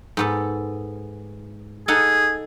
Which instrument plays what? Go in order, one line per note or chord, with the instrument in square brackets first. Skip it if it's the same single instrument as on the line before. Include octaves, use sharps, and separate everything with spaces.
[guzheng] G#2 B3 A4
[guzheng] D#4 A4 F#5 [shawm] G#4